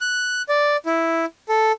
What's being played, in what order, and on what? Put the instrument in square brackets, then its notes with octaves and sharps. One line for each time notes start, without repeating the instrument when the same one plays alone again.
[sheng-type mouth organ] F#6
D5
E4
A4